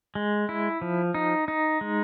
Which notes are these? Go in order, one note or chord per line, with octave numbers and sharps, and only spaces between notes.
G#3
E4
F3
D#4
D#4
G#3